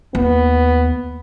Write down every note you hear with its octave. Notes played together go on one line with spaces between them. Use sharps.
D#2 B3